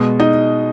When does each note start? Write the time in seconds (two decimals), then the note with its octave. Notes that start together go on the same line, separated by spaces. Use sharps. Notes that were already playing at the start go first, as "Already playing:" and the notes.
Already playing: B2 G#3
0.20 D#4 D#5